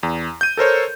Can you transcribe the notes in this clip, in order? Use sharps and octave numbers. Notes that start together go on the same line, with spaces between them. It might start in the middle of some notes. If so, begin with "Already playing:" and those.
E2
G6 D#7
A4 A#4 C5 C#5